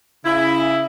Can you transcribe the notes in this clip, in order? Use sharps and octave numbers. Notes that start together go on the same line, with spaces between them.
C#3 E4